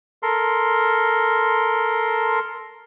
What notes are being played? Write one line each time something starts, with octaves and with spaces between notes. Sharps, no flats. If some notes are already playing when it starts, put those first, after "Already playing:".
A4 A#4 C6